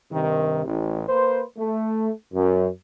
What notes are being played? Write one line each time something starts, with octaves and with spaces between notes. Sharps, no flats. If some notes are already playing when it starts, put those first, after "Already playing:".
G2 C3 D#3
A1
A#3 B4 C5
A3
F#2